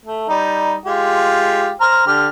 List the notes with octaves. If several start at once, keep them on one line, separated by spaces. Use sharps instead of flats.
A3
G3 D#4
G#3 F4 G4
C5 A#5 F6
D3 G4 F6